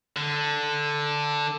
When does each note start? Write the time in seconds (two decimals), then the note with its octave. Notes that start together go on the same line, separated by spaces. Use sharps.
0.16 D3